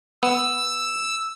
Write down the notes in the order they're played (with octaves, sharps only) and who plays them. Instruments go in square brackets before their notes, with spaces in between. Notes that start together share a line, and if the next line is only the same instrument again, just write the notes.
[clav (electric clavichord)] B3 [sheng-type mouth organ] E6